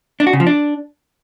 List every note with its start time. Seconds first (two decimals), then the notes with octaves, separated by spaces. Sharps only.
0.20 D4
0.27 F#4
0.33 C#3
0.40 F3
0.47 D4